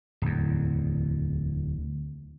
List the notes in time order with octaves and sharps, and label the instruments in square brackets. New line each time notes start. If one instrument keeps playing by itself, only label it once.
[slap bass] D1 E2